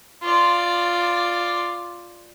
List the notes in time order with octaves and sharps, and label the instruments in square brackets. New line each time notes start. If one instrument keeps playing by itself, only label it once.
[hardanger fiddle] F4 D5